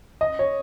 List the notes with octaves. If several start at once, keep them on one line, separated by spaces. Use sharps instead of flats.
D#5
C#5